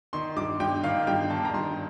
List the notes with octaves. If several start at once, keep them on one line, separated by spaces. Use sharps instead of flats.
D#3 C6
G2 D6
G2 G5
D#3 F5
G2 G5
D#3 A5
A#5
G2 C6